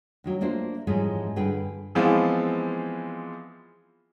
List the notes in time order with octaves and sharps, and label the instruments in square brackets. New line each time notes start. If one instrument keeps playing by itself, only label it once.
[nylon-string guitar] D2 D#3 F#3
A3 A#3 D4 F4 C5
G#2 E3 F3 G3 G#3 C#4
G2 D3 G#4 B4 G5
[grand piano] E3 F3 G#3 B3 C4 F4